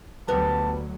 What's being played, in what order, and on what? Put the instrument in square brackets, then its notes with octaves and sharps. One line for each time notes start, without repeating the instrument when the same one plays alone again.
[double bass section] D2 F#3 [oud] G3 B3 [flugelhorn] A5